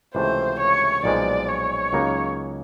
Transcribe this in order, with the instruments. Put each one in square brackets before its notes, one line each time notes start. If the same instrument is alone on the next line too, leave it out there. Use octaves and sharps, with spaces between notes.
[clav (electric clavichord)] C#2 C3 E3 A3 [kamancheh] C5
[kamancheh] C#5
[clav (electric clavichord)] B1 A#2 F3 G#3 [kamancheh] D5
[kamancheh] C#5
[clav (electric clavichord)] C#2 C#3 F#3 A#3 D#4